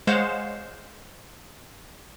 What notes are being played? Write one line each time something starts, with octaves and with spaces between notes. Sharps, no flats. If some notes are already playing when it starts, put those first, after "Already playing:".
G#3 C5 C#5 F5 F#5 E7